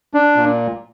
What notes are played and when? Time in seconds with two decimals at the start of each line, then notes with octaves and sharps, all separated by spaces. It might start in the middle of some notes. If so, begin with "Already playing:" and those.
0.14 D4
0.36 A#2